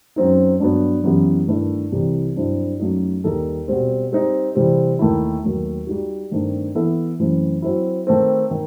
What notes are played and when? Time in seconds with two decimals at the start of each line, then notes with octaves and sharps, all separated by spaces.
0.16 F#2 F#3 C4 D#4
0.60 G2 F#3 B3
1.04 F#2 E3 B3 E4 G4
1.48 G2 D#3 A3 E4 B4
1.92 C2 C3 E3 G3
2.36 G2 F#3 C4 E4
2.80 F#2 F#3 A3 D#4
3.24 D#2 D#3 G3 D#4 A4
3.68 B2 G3 C4
4.12 G3 C4 D#4
4.55 C3 E3 G3 C4
4.99 D#2 D#3 A3 E4
5.43 D#2 D#3 F#3 A3
5.87 G3 D#4 F#4
6.31 G2 D#3 A3 C4 D#4
6.75 E3 B3 E4 A4 E5
7.19 F#2 E3 A3 C4
7.62 F#3 C4 E4
8.07 D#3 A3 C4
8.51 D#3